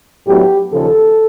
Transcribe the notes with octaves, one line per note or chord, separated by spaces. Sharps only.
A2 F#3 B3 D4 G4
D#2 C#3 F3 A4